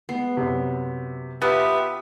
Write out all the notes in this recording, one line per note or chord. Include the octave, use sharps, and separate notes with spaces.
G#3 B3 C7
F#2 C3
B3 F4 G4 B4 E5 A5 E6 F6